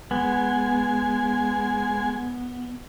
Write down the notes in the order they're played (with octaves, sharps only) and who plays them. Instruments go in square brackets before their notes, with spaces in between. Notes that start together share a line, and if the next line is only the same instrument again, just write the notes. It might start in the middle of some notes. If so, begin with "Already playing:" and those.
[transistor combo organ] G#3 G#5 [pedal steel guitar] B3